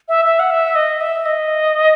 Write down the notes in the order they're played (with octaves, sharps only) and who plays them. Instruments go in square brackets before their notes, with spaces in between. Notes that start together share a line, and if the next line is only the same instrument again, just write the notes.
[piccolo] E5
E5
F#5
E5
D#5
E5
D#5